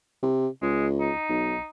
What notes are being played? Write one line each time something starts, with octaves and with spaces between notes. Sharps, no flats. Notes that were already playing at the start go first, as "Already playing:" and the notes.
C3
C#2 G#3
D#4
B1